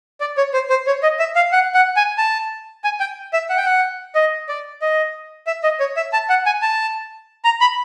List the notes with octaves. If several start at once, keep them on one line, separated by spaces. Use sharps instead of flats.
D5
C#5
C5
C5
C#5
D#5
E5
F5
F#5
F#5
G#5
A5
G#5
G5
E5
F#5
G5
F#5
D#5
D5
D#5
E5
D#5
C#5
E5
A5
F#5
G#5
A5
A#5
B5